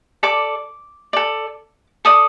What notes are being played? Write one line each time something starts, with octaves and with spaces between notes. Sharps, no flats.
A4 D5 D6
A4 D5
A4 D5 D#6